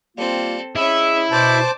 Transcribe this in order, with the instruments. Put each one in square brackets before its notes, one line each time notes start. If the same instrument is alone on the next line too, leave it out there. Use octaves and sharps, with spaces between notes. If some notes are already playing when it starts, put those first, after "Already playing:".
[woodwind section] G3 A#3 F4 [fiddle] C4 A4
[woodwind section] G#3 G#4 E6 [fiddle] C#4 E5 [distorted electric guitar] E4
[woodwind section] B2 [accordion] C5 A5 [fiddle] D5 D6